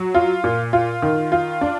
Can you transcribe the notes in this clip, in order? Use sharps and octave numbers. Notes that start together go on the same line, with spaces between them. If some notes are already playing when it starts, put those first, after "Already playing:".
Already playing: F#3
F4
A#2
F4
D#3
F4
D4